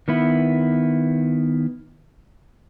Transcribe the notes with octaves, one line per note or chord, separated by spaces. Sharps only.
D#3 B3 E4